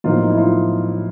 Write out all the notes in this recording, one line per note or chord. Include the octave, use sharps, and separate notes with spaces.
B1 A2 F3 A#3 D#4 F4
D#4
E4
D#4 F4